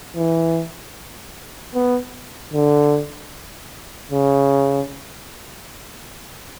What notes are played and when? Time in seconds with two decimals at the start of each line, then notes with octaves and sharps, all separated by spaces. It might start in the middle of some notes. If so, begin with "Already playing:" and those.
0.16 E3
1.75 B3
2.53 D3
4.11 C#3